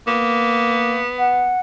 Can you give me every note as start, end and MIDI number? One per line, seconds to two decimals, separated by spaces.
0.07 1.03 58
0.07 1.57 59
1.19 1.60 78